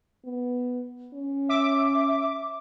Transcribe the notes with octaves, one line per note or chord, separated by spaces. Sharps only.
B3
C#4
E5 D6